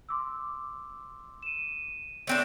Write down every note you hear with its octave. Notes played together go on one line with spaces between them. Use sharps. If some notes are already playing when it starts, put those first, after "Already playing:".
C6 D6 E6
D#7 E7
A3 C4 D4 C#5 E7